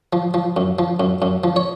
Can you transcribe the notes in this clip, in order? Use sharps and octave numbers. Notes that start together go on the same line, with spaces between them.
F3
F3
F#2
F3
F#2
F#2
F3
C#5